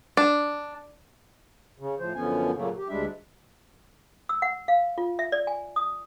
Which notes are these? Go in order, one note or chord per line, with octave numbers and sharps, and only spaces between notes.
D4
C#3
A2 F3 C5
F#2 D3 F3 B3 C#4 G#5
A#2 C#3 F#3 A3 A#3
G4
D2 G3 G#3 D4 E5
E6
F#5
F5
F4
E5
D5
G#5
D#6